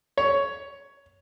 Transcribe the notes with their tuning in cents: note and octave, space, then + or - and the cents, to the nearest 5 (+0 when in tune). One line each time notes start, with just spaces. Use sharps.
C#5 +10